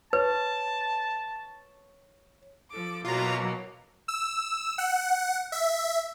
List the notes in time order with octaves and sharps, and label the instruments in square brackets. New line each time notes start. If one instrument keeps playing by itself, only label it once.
[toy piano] B4 [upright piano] C#5 [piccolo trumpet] A5
[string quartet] F3 A4 D6
[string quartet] B2 E3 A#3 [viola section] F#3 [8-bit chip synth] F4 A#5
[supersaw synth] E6
F#5
E5